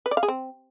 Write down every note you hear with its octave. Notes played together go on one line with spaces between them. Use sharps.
B4
D5
F5
G#4
C4